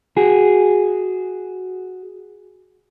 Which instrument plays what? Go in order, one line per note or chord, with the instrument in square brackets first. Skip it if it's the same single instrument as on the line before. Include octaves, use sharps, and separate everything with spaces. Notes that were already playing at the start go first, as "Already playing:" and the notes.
[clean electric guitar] F#4 G#4